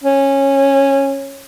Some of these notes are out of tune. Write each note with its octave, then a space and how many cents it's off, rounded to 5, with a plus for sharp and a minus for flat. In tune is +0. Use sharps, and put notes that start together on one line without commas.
C#4 -15